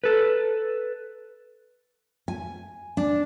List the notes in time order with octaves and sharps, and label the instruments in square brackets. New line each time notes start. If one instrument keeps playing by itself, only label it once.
[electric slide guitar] A4 B4
[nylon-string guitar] G#5
D4